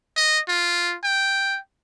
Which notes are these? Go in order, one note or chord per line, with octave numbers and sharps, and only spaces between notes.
D#5
F4
G5